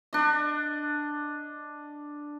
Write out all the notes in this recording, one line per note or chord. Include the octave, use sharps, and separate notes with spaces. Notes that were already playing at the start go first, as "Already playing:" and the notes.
D4 D#5